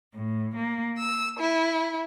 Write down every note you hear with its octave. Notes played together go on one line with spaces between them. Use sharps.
A2
A#3
E6
E4